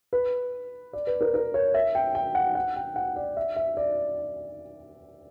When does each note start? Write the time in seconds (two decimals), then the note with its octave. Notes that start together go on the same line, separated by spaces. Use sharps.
0.13 B4
0.93 D5
1.07 B4
1.21 A#4
1.34 A#4
1.54 C#5
1.74 E5
1.95 G5
2.15 G5
2.35 F#5
2.55 F#5
2.76 G5
2.96 F#5
3.16 D5
3.37 E5
3.56 E5
3.77 D5